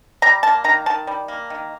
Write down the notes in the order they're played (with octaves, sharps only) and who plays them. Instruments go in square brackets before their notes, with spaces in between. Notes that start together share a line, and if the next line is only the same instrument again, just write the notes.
[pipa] G3 A#5
A#3 A5
D#3 A#5
D#3 A5
G3
A#3
D#3